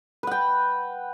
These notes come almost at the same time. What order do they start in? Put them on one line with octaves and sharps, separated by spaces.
B4 F#5 G5